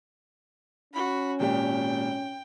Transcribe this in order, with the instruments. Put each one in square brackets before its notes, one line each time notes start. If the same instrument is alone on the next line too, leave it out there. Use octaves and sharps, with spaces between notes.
[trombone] C#4 [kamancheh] F#4 B5
[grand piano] G#1 A#2 G4 [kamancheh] G5